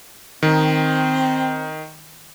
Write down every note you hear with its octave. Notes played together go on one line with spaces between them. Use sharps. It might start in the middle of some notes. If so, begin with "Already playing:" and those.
D#3 C4